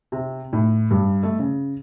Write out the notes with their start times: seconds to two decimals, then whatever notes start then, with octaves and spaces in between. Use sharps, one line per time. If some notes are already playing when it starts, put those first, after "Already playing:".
0.12 C3
0.53 A2
0.91 G2
1.23 A3
1.39 C#3